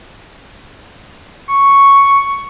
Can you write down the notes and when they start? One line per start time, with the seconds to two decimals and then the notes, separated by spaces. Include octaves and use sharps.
1.49 C#6